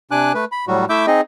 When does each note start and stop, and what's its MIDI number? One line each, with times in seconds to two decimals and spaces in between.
0.11 0.32 48
0.11 0.32 62
0.11 0.32 80
0.11 0.32 86
0.11 0.32 90
0.34 0.45 57
0.34 0.45 71
0.52 0.65 83
0.68 0.85 45
0.68 0.85 54
0.68 0.85 55
0.68 0.85 66
0.90 1.06 57
0.90 1.06 64
0.90 1.06 76
0.90 1.06 86
0.90 1.06 88
0.90 1.06 91
1.07 1.21 60
1.07 1.21 63
1.07 1.21 68
1.07 1.21 75